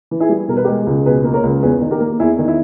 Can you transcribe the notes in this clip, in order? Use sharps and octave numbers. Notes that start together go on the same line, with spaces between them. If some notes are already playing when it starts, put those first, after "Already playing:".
E3
E4 G#4
G3
B2 A#4
B4
G#3 G4 A#4
C#2
B2 G#4 B4
A#3
A#4 C#5
C#2
E2 G#4 B4
D#3
G4 A#4
A#3
E2 E4 G#4
D#3
E4